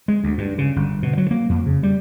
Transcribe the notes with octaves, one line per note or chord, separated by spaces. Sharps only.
G#3
D2
G2
C#3
G1
B2
F#3
A#3
F2
C#3
G3